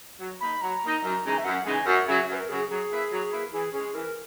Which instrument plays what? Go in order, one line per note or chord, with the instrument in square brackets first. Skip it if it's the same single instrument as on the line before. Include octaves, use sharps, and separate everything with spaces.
[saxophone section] F#3
[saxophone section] A#3 D#4 [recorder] B5
[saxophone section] F#3 [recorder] A#5
[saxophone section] A#3 D#4
F#2
C#3 E3 G#3 D#4
[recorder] E5
[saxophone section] F#2 [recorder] F#5
[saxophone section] C#3 E3 G#3 D#4 [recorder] G#5
[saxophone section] F#2 [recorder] F#5
[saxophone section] C#3 F#3 [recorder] E5
[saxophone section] F#2 [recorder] B4
[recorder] A#4
[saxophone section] C#3 F#3 [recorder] G#4
[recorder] G#4
[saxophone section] F#3 [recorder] G#4
[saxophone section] A#3 E4 B4 E5
F#3
A#3 E4 B4 E5
[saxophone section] E3 [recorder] G#4
[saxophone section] G#3 C#4 [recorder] G#4
[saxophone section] E3 [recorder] A#4